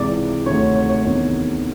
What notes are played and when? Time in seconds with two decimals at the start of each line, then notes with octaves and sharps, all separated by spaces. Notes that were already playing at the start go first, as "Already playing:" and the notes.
Already playing: C#2 C3 E3 D5
0.46 D2 C3 D#3 C#5
0.76 C#5
0.89 C#5
1.05 E2 C3 D#3